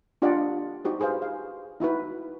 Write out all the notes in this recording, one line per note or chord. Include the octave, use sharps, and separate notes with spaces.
D4 F4 G4 D5 D#5 F#5
D#4 F#4 G4 C5
G4 G#4 B4 C5 F5
F5
D#4 E4 F#4 B4